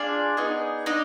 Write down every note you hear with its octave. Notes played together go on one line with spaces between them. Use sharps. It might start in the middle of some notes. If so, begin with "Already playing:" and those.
Already playing: D4 F4 G#4 D5
B3 D#4 G#4
D4 D#4 D#5